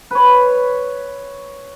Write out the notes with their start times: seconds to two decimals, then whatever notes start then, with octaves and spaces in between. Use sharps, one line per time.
0.11 B4 C#5